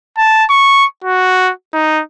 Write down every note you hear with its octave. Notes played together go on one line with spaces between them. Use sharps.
A5
C#6
F#4
D#4